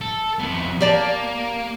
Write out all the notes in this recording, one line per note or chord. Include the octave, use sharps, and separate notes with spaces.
A4
F2 B3
A#3 G4 D5 A5